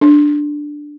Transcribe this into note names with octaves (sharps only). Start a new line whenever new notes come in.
D4